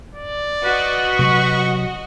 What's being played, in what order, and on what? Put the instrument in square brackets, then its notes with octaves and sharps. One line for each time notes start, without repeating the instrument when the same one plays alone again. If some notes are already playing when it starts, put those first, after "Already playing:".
[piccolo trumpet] D5
[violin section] F#4 D#5 [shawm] B4
[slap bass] C3 F#3 [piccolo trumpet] C#6